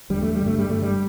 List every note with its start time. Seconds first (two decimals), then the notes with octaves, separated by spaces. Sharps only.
0.10 E2 D3 G3
0.22 A3
0.34 G3
0.40 G2 D3
0.46 A3
0.58 G3
0.69 G2 D3 A3
0.82 G3